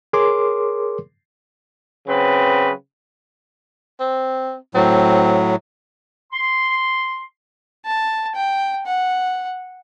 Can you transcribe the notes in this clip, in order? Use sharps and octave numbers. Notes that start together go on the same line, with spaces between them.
G#4 A#4 C#5 C6 D6
C#3 F#3 C4 B4
C4
A2 F#3 C4
C6
A5
G5
F#5